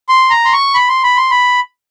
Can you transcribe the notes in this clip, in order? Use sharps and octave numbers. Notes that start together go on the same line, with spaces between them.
C6
A#5
C6
C#6
B5
C6
B5
C6
B5